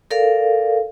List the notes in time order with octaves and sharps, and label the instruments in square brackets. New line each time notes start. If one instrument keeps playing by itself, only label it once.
[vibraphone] A4 A#4 D5 F5